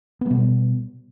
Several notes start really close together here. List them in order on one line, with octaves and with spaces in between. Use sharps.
B3 G3 B2